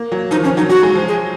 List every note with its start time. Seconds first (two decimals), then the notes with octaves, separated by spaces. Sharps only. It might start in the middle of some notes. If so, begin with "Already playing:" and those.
Already playing: A#3
0.12 F#3
0.31 F3 D#4
0.37 D#3
0.44 F3 C#4
0.57 F#3 D#4
0.69 F#3 F#4
0.83 G#3
0.95 F3
1.08 G#4